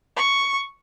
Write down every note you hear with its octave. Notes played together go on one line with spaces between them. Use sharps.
C#6